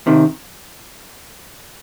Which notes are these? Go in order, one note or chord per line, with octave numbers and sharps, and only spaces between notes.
C3 D#3